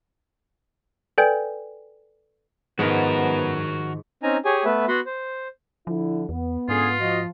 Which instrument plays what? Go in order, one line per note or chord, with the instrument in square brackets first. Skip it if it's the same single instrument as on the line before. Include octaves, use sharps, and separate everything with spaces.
[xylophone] A4 B4 D5 G5 G#5 G6
[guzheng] G#2 F3 [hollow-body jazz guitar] D#3 G#3 [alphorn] B3 [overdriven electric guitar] F#4 A#4
[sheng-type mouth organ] C4 C#4 D#4 G#5 A#5
G4 G#4 C#5 G#5
A3 B3 B4 E5
B3 F#4 F#5 B5 C6
C5
[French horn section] D3 E4 [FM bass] F3
[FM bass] E2 [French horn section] B3
[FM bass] G#2 [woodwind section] D3 C#4 G#4 [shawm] F4
[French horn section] F3 [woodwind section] F#4 D#5